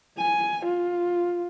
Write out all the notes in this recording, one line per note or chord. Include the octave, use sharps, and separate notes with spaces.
G#5
F4